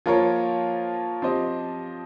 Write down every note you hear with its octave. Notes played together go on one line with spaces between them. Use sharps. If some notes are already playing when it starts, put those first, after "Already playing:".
F3 A#3 F4 A#4 C#5
F3 C4 G4 C5 D#5